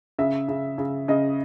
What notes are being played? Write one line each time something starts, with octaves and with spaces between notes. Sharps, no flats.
C#3 E5
C#3
C#3
C#3 D#5